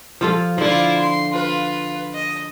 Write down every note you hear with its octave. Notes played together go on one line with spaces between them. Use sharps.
F3 F4 A4
D3 F3 E4 F4
C6
F4 B4
D#5